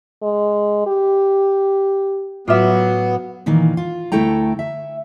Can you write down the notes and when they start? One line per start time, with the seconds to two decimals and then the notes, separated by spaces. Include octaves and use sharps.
0.23 G#3
0.87 G4
2.48 A2 F#3 B3 F4 E5 D6 F6
3.46 A#2 D#3 E3 A#3
3.77 F4
4.12 D2 A3 E4 A4 G5 A#5
4.59 E5